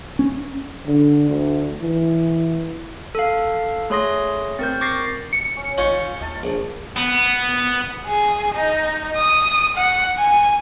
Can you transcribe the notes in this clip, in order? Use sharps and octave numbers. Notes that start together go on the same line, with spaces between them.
C#4
D3
D2
E3
A4 F5
A3 G#4 C#5 C6 D#6 A#6
C4 A#4 G6
C#6 D6 A6 A#6 C7
C#7
C#4
A1 C#4 D#4 F4 C#5
D#2 D#5 A5
A#1
B3
G#4
D#4
D#6
F#5
G#5